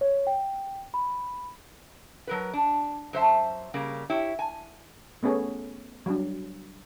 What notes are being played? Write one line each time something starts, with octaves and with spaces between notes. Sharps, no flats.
C#5
G5
B5
F#3 A#4 B4
D4
F#2 C5 E5 A5
C#3 G3 A#3
E4 G4 C#5
G#5
A3 B3 C#4 G#4 A4 C#5
F#3 G3 D4